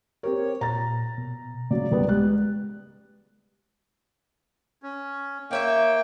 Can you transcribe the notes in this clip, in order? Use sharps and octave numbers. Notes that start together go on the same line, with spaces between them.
C4 G4 A#4 C#5
A#2 A#5 A6
B2
C#3 F#3 D5
C#2 G3 B3
G#3 G4 F#6
C#4
A#3 D#4 C#5 E5 G5